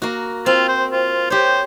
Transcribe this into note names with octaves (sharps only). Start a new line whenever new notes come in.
A#3 F#4
C4 F4
C5
F4
G4 C5 C#5